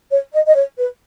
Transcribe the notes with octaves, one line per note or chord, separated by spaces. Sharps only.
C#5
D#5
D#5
C#5
B4